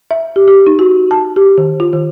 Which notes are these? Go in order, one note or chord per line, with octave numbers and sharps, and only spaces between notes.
E5
G4
G4
D#4
F#4
A5
G4
D#3
F4
D#3